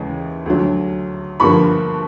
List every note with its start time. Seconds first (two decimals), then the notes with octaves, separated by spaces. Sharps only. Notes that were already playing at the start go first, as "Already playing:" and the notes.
Already playing: D#2 C#3 E3 G#3
0.46 D2 D3 F#3
1.40 G1 G2 D3 F3 A#3 B5 C#6